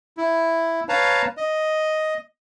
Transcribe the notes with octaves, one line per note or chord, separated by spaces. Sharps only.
E4
B4 C#5 F5 A5 A#5
D#5